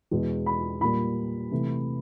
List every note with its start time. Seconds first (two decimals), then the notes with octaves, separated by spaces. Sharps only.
0.11 E2 B2 G#3
0.46 B5
0.81 A#2 G3 A#3 B5
1.51 C3 E3 A3